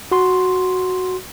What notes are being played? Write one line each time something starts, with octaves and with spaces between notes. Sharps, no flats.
F#4 C6